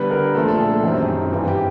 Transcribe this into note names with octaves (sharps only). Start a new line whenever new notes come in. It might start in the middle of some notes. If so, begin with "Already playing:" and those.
Already playing: D3 G3 B3 B4
A#4
A#2 F3 A3 D4 A4
A4
G#4
F#2 D#3 G3 C4 D#4
G2 E3 G3 C4 G4
G4